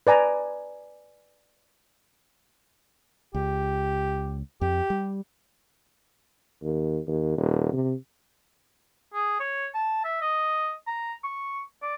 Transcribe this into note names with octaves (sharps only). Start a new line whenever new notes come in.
B4 D5 G#5 A#5
C#2 G4
F2 G4
G3
D#2
D#2
D#1
C3
G#4
C#5
A5
E5
D#5
A#5
C#6
D5